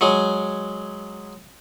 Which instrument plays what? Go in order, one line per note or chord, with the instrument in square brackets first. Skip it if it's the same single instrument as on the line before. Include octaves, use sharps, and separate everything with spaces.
[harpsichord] F#3 G#3